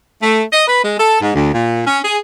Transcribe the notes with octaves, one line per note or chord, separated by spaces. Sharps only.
A3
D#5
B4
G#3
A4
G#2
D2
A#2
C#4
G#4